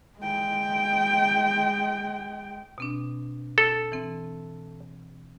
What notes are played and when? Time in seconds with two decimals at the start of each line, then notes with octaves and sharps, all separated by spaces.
0.19 G#3 G5
2.78 B2 C4 D4
3.58 A4
3.92 E3 C4